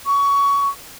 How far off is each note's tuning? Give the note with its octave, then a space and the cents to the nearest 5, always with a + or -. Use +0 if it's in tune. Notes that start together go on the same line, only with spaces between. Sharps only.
C#6 +20